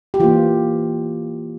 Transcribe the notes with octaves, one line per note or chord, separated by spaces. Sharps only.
G4
E3 A#3 F4